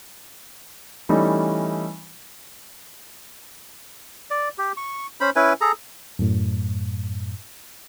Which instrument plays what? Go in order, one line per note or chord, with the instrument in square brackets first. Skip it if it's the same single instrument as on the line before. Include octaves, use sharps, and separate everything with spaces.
[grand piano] E3 G3 A3 C#4 D#4
[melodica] D5
G4
C#6
C#4 C5 B5
C#4 E4 B4 G#5
G#4 A4 A#5
[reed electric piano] F#2 A2